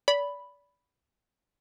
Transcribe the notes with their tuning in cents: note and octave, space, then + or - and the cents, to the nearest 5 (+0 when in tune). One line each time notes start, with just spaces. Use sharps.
D5 -30 B5 +0